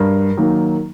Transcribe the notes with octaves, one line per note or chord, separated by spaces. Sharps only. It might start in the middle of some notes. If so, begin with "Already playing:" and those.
Already playing: G2 A#4
D#3 F#3 A#3